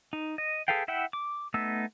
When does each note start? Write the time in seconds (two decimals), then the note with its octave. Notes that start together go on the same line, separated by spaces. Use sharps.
0.13 D#4
0.38 D#5
0.68 G#4 A4 B4 F5 G5
0.88 E4 E5 F#5 G5
1.13 D6
1.54 A3 B3 D#4 E6